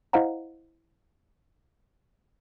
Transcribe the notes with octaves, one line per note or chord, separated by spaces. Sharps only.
E4 C5 D#5 F5 F#5 A#5